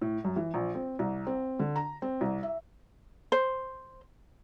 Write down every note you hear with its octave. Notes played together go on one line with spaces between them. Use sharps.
A2
F#2
E3
A#1
C4
C2
C4
D3
A#5
C4
C2
E5
C5